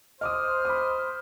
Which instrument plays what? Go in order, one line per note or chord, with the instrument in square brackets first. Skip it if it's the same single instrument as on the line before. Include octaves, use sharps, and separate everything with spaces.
[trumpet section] C5 [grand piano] D#5 D6 D#6 [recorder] F6
[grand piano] B5 D6 D#6